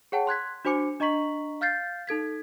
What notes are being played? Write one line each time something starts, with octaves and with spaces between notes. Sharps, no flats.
G#4 C#5 F#5 G5 A5
C6 F#6 G#6 B6
D4 F#4 C5 G#5 D6 C#7
D4 D#5 A#5 C#6 B6 F#7
F5 F6 G6 A6 C7
D#4 A4 G#6 B6